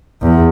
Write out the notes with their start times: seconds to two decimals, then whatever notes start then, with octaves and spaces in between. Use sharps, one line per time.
0.22 E2